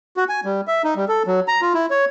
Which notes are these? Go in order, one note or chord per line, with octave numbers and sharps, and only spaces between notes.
F#4
G#5
G3
E5
D#4
G3
A4
F#3
A#5
F4
E4
C#5